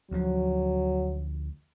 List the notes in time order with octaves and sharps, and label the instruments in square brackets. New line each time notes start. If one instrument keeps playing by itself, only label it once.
[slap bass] D2 F3 [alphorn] F#3